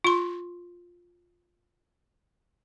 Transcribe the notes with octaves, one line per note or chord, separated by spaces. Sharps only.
F4 C6